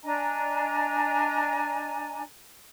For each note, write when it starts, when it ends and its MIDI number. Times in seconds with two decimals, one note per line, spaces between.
0.03 2.22 62
0.03 2.22 75
0.03 2.22 80
0.03 2.22 82